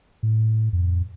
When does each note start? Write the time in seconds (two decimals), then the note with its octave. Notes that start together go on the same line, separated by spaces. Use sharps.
0.23 A2
0.73 F2